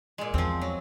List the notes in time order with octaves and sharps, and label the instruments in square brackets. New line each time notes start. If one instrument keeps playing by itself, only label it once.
[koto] A#2 G#3
[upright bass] E2 [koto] F3 C4
[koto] F#3